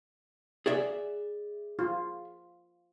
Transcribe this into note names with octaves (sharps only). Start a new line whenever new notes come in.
G#4 D5 E5
F4